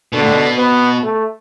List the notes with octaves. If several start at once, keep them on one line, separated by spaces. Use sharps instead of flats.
B2 D3
A2
B2
B3
A3